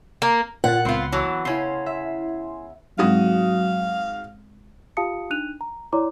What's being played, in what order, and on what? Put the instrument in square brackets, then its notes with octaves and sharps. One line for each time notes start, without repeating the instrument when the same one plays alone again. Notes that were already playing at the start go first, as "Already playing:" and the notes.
[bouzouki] A#3
[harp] A#2 F#6 C#7 [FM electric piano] F4 A6 [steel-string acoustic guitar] F#5
[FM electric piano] C#2 [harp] B3 B5 C6 [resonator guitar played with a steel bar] C4 F4
[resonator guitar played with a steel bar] E3 F#3 [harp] A5 E6
[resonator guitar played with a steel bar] C#3 C#4 [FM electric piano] E4 G#5 C6
[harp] E5
[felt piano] G#2 F#4 D#6 [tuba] F#3 [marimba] G#3 C4 [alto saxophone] F5
[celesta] F4 G4 F5 A5 D#6 C#7
D4 D#4 F#6 D#7 F7
A#5
E4 C#5 D5 A#5 C6 D6